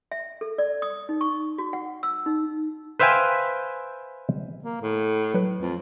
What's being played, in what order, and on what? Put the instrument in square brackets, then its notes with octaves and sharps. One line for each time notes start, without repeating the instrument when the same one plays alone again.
[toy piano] E5
A4
D5
D#6
D#4
C#6
F#4
F#5
E6
D#4
[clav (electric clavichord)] B4 C5 E5 F5 G5 G#5
[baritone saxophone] A#3
A2
[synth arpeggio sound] F#3 B4
[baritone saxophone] F2